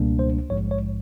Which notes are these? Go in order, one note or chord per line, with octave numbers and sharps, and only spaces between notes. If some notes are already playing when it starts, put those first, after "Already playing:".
Already playing: C#2 B2 G3 A#3 D4
C5
A#1 G#2 F3 G#3 C#5
C#5